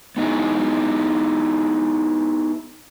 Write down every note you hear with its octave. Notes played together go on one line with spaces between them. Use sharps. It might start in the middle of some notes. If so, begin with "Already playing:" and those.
B3 D#4 E4 G#4